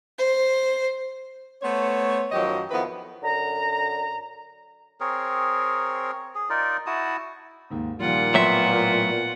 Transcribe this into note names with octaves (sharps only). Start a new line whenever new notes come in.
C5
A3 B3 C5 C#5
F#2 D#3 F3 F#3 G4 D#5
F2 D#3 F3 B3 E4 B4
F#2 D3 A#5
C4 G#4 A#4 C#5
G#4
D#4 F4 A#4 D5
E4 F#4 A5 D#6
D#2 G#2
A#2 D#3 F3 G3 F4 F#5
A2 F#3 B3 E5 C6